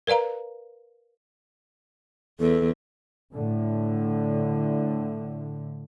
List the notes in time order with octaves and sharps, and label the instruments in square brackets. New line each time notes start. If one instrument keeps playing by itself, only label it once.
[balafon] A#4 B4 D5 F5 A#5
[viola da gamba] E2 [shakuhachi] A4
[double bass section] A2 D3